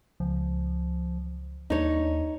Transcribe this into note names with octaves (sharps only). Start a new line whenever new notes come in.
C#2 F3
D#2 D4 D#4 C#5